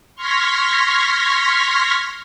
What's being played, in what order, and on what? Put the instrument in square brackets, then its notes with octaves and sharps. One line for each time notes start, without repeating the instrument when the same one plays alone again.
[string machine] C6 C#6 F6 G#6 A#6 B6